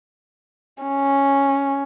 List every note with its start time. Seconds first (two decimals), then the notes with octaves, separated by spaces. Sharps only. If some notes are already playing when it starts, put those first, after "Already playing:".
0.83 C#4